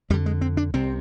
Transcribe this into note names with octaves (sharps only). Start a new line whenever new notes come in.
F2 D3 G3
G#3
C4
D4
C2 C3 C4